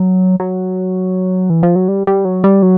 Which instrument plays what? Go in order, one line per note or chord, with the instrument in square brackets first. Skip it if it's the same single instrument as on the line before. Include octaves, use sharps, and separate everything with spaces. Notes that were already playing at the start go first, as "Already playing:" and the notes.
Already playing: [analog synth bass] F#3
F#3
E3
F3
F#3
G3
G3
F#3
G3
F#3